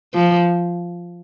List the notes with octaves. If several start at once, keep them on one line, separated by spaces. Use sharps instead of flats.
F3